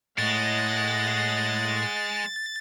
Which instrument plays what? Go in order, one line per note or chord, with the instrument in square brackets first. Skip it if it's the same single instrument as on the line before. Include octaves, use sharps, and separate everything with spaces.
[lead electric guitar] A2 [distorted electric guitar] G#3 [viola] D#5 F#5 [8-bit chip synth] A6